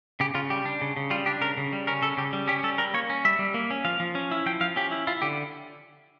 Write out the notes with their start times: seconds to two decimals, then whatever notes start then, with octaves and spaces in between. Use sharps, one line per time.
0.20 C#3 G4
0.34 C#3 F4
0.50 G3 G4
0.65 D4
0.81 C#3
0.97 C#3
1.10 G3 F4
1.26 D4 G4
1.41 C#3 A#4
1.57 C#3
1.73 G3
1.87 C#4 A#4
2.02 C#3 A4
2.17 C#3 G4
2.33 G3
2.48 C#4 G4
2.63 G3 A4
2.78 G3 A#4
2.94 A#3 C#5
3.10 C#4
3.25 G3 E5
3.39 G3
3.54 A#3
3.71 C#4
3.85 F3 F5
4.00 F3
4.15 C#4
4.31 E4
4.46 F3 G5
4.61 F3 F5
4.76 C#4 G4
4.91 E4
5.07 E4 F4
5.22 D3 G4